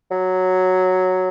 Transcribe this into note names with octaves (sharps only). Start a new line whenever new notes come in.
F#3